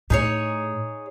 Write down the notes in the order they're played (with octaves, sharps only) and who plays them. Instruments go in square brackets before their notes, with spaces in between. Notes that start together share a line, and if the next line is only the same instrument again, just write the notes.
[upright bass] A2 [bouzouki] D#4 G#4 C#5